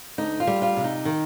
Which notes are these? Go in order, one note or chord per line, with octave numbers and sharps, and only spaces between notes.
D2 D#4
F4
G3
F4
C3
D#4
D#3